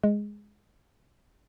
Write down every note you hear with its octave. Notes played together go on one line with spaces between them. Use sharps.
G#3